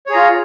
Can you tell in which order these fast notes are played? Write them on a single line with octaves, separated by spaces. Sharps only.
C#5 G#4 A#5 F4